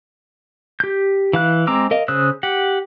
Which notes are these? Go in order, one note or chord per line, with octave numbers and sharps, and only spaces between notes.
G4 G6
E3 F5 F#6
G#3 C4 A#5 D6 E6
A#4 D#5 F5
C#3 C5 D#6 E6 F#6
G4 F#5